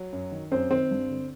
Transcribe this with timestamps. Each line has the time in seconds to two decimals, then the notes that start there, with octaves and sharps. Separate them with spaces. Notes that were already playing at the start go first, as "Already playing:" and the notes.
Already playing: F#3
0.13 F#2
0.32 D#3
0.52 F#2 C4 C5
0.70 D#3 C4 C5
0.91 G2
1.10 D3